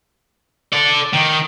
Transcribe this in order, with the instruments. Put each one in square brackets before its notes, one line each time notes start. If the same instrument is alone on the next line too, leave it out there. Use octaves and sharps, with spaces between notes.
[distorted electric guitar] A4 D5
D#3